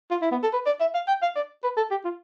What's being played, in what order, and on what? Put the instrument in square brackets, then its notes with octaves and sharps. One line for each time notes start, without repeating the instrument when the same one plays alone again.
[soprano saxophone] F4
E4
B3
A4
B4
D5
E5
F5
G5
F5
D5
B4
A4
G4
F4